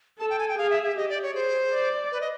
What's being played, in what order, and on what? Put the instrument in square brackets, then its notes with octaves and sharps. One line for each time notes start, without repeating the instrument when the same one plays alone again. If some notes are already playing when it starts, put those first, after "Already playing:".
[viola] A4 [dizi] A5
[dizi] G5
G#5
G5
[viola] G#4 [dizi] F5
[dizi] E5
E5
[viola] G4 [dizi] D#5
[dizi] D5
C#5
[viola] G#4 [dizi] C5
[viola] D5
[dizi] B4
D#5